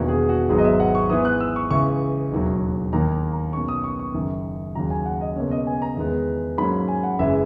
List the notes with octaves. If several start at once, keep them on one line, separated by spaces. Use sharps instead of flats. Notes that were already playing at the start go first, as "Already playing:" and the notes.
Already playing: E1 E2 D#3 A#3 F#4
G#4
F#4
G#1 G#2 F#3 B3 G#4
D#5
E5
F#5
C#6
G#2 E3 B3 D#6
F#6
E6
C#6
C#2 C#3 E3 C#6
E1 D#2 D#3 F#3
D#2 D#3 A#3 A#5
A#5
B1 B2 A#3 C#4 C#6
D#6
C#6
C#6
F#1 F#2 D#3
D#2 C#3 F#3 A#5
G#5
F#5
D#5
C#2 B2 A#3 C#4 C#5
D#5
G#5
A#5
E2 D#3 G#3 B3
G#2 F#3 A#3 C#4 B5
G#5
F#5
F#1 F#2 E3 G#3 E5